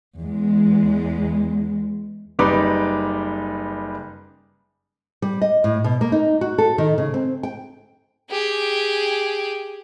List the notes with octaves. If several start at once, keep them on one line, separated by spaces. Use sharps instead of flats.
E2 G#3
F#1 G3 D#4 B4 D6
G3
D#5
A2
B2
A#3
D#4
F#4
A4
D#3
C#3
C4
G5
G4 G#4